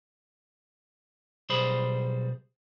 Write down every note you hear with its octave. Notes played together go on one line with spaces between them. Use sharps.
B1 G3 G#4 C5 B5